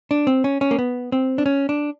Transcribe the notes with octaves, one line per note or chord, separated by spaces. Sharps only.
D4
C4
C#4
C#4
A#3
B3
C4
D4
C#4
D4